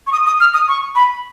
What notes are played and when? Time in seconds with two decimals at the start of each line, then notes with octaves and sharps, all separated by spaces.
0.07 C#6
0.12 D#6
0.26 D#6
0.40 F6
0.54 D#6
0.68 C#6
0.95 B5